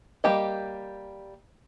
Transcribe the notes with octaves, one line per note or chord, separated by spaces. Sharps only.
G3 A#3 G4 D#5